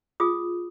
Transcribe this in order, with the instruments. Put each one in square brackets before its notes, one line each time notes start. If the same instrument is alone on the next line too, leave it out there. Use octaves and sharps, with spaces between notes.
[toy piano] F4 G#4 D#6